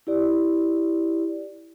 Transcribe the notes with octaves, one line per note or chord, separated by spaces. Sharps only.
E4 G4 D5